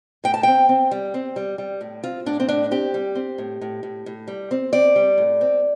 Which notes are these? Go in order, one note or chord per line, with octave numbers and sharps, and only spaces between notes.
A2 G5
A5
C4 G5
C4
G3
C4
G3
G3
A2
C4 F4
A2 D4
C4
A2 D4
C4 G4
G3
C4
A2
A2
A2
A2
G3
C4
C4 D5
G3
A2
C4